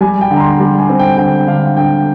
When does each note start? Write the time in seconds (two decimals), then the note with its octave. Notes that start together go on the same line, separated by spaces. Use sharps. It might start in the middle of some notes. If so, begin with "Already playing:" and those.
0.01 G3 G#5
0.21 G5
0.31 D3
0.36 A#5
0.40 C6
0.60 G3
0.79 G#5
0.89 C4
0.99 G5
1.18 D3 G5
1.47 D3 F5
1.77 D3 G5